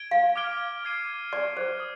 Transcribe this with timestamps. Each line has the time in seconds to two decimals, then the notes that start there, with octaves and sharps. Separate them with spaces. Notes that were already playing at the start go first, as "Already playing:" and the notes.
Already playing: G#6 D7 G7
0.11 F5
0.36 D6 F6 G#6 D7 G7
0.84 D6 G#6 C7 D#7
1.33 D5 G#6 D#7 G7
1.57 C5
1.80 D#6